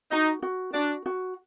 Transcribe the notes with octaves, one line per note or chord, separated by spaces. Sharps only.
D#4 F#4
F#4
D4 F#4
F#4